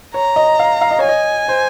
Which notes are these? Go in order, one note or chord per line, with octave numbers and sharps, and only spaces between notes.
C#5 A#5
D#5
F5
F5
D#5
C#5
G#5
D#5
C5